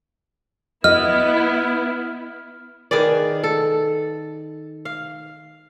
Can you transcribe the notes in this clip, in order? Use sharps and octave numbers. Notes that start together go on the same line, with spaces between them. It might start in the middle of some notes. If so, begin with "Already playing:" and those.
B3 E4 D#5 F6
D#3 G#4 B4 D5
A4
F5